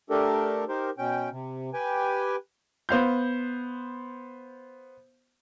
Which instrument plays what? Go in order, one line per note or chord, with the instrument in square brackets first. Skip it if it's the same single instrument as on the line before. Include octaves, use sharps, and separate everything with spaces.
[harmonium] A3 D4 G4 A4 A#4
D#4 G4 A#4 C5
B2 C#4 G5
C3
G4 B4 G5 G#5
[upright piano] B3 C5 F5 G6